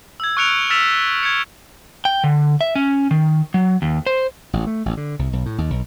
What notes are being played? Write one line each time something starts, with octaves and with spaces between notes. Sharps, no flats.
E6 G#6
C#6 F6 F#6 C#7 D7 F7
E6 F6 A6 B6 E7 F7
G#6 C#7
G5
D3
E5
C#4
D#3
F#3
D#2
C5
A1
A3
A1
D3
C2
B1
A2
D#2
B1